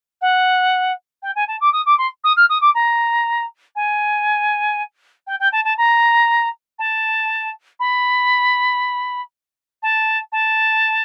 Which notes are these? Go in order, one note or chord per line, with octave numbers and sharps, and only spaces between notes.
F#5
G5
G#5
A5
D6
D#6
D6
C6
D#6
F6
D#6
D6
A#5
G#5
G5
G5
A5
A5
A#5
A5
B5
A5
A5